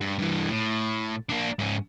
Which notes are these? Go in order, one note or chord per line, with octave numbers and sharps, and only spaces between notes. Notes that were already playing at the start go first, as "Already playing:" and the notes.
G2
G2 E3
A2
A#3 D4
G#2 C#4